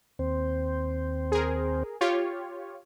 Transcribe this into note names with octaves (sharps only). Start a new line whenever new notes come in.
D#2 C4 C5
G#4 A#4
F4 G4 C#5